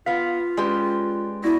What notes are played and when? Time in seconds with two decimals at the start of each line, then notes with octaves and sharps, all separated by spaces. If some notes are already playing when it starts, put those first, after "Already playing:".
0.06 B3 F4 F5 B6
0.57 G#3 C#4 G4 B4 D5
1.44 B3 E4 F#4 D5 A#6